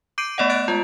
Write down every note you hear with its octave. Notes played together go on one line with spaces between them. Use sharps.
D6 G6 C7 D7 D#7
A3 B3 D5 D#5 F#5
F#6 A6 D7
G#3 F4